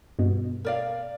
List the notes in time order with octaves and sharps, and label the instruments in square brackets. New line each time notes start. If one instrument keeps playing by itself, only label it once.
[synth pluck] G2 B2
[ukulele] A#4 D5 F5